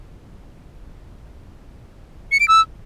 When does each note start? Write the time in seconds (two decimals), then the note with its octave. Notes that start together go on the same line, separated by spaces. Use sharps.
2.32 C#7
2.40 D7
2.48 E6